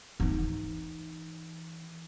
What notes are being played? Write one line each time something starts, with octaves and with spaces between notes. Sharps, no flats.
E3 D#4